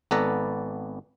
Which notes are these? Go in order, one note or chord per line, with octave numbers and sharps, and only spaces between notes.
G#1 B3 A4 B4 D5 A#5